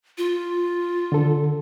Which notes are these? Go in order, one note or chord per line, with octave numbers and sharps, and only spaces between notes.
F4
D3 A4